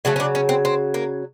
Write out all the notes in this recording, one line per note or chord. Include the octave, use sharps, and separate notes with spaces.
C#3 F#3 A3 F#4
C#4
D4
C#4
C4
C4
A#3